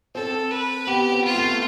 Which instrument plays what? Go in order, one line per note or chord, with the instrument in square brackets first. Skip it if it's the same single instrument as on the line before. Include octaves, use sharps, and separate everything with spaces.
[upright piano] C4 [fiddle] A4
[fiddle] B4
[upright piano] B3 [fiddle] G4
[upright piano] C4
[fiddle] F4
[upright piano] A3